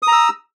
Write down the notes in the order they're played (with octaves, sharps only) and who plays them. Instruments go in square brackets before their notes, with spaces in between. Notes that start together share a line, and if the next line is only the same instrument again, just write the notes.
[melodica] D#6
A#5
E6